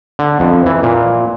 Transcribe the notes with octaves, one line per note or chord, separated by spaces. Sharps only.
D3
F2
E3
A#2